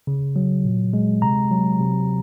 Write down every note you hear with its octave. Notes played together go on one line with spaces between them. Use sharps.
C#3
F#3
A#2
G#3
C3 A#5
F#3
C3